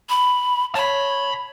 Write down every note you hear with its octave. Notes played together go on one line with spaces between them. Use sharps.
B5
C#5 A5 B5